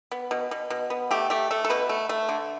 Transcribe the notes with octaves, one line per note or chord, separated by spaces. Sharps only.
B3
B2
B2
B2
B3
A3 G4
A3 G4
A3 A4
A4
B2 B4
A3
A3
D3